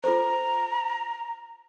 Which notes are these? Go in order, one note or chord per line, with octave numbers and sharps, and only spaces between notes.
F4 A4 C5 A#5